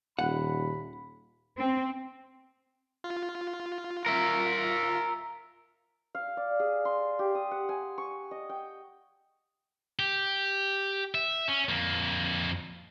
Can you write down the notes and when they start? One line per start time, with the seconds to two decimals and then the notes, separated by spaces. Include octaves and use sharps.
0.19 D#1 F#5 B5
1.56 C4
3.04 F4
4.06 A#4 E5
6.15 F5
6.37 D5
6.60 G#4
6.85 C6
7.19 G4
7.35 D#6
7.51 F#5
7.69 G#5
7.98 C#6
8.31 D#5
8.49 G5
9.99 G4
11.15 E5
11.48 C#4
11.69 F2 A#3